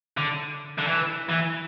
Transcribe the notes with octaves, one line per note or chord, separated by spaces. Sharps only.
D3
D3
E3
E3